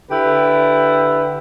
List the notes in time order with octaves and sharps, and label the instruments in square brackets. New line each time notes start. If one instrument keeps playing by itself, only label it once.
[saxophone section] D3 E4 G4 B4